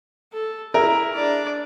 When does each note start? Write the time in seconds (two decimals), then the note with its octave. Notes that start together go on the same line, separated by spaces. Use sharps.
0.33 A4
0.74 E4 G#4 A#4 E5
1.14 D4 D5